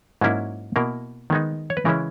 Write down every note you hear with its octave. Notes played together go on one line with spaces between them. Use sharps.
G#2 F#3 A#3 C#4 E4
B2 A#3 E4 A#4
D#3 G#3 B3 D#4
C#5
B4
C#3 E3 G#3 C#4 E4 A#4